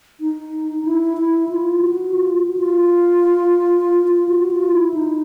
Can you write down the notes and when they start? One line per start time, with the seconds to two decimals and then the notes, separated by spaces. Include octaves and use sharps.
0.20 D#4
0.85 E4
1.17 E4
1.49 F4
1.81 F#4
2.14 F4
2.36 F#4
2.57 F4
4.08 F4
4.29 F#4
4.51 F4
4.72 E4
4.94 D#4